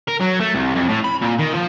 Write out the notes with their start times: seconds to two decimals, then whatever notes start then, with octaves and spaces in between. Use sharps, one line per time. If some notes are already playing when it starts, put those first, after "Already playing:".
0.08 A#4
0.20 F#3
0.40 A3
0.54 C2
0.75 F2
0.89 A2
1.04 B5
1.22 A#2
1.39 D#3
1.54 F3